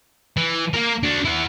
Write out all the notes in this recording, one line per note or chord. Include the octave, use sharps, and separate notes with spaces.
E3
A#3 A#4
D4 F#4
E4 F#5